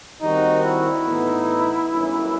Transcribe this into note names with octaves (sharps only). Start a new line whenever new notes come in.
D#2 D#3 G3 C4 D#4 F#4
E4
A2 E3 B3 D#4
G1 F#2 E3